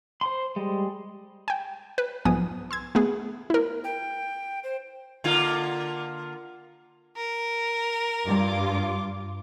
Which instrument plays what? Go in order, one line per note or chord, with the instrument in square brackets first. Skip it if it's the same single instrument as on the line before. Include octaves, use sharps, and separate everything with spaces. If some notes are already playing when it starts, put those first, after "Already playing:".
[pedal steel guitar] C5 C6
G3 G#3
[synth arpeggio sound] G5 G#5
B4
B1 G#2 F3 B3 G#5 D#6
C6 E6 G#6
A3 B3 G#4
E4 A#4
[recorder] G5
C5
[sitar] D3 A#3 F4
[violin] A#4
[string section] G2 F4 D6